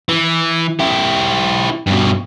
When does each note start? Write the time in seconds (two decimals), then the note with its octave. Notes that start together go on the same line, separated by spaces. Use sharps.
0.09 E3
0.80 E4 G4
1.87 G2 B2